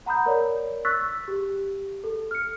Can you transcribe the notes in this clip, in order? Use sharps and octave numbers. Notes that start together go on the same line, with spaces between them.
F#5 A#5 B5 D#6 G6
A#4 C#5 D5
C#6 E6 F#6 A6 B6
G4
A4
F6 C#7